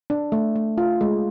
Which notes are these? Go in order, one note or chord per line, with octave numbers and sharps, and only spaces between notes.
D4
A3
A3
F4
G#3